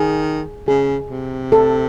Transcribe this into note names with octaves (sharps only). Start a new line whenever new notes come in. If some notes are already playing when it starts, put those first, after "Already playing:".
Already playing: D#3 G#4
C#3 G#4
C3
A4